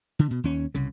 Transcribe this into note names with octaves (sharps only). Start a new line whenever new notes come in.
D3
B2
D#2 C#4
C2 C#3